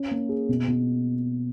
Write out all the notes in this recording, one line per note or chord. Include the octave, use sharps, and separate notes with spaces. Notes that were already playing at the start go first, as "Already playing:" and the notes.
Already playing: C#4
A#3
G#4
B2
B2